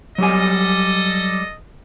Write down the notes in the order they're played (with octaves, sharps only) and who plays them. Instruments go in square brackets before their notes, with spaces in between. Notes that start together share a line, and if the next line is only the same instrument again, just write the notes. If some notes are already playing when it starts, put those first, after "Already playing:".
[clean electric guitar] F#3 G3 G#5 [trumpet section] A4 D#5